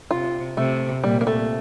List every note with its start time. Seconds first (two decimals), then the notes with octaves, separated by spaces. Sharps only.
0.11 C3 F4
0.57 C3 A3
1.03 A#2 G3
1.21 A#3
1.27 A3